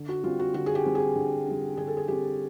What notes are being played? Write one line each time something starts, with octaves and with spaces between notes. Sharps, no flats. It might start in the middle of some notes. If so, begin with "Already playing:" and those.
Already playing: D3
F#4
G3 C4 F4
F#4
D3 F#4
G#4
G4
G3 C4
G#4
D3
G3 C4
D3 G#4
A4
G#4
G3 C4 G4